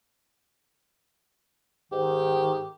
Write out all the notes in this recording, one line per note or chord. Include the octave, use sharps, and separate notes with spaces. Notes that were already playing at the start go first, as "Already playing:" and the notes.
G#2 D#3 G4